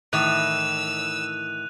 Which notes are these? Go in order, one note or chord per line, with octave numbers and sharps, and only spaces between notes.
A2 D#3 E3 E6 F#6 D#7 F7